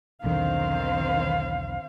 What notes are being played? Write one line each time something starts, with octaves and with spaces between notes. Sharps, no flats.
B1 E2 D3 D#3 C4 C5 F5